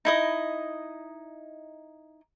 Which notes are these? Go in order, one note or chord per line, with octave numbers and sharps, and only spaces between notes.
D#4 E4 D#5